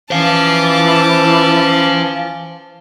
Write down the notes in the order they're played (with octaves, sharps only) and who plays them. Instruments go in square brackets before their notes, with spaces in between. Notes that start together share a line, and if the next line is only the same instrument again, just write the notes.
[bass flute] E3 [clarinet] C#4 [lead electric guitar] C5 F5 [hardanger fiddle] A5 D6